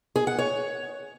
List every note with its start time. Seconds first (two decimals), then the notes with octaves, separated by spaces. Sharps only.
0.16 G#4
0.27 F#5
0.38 C#5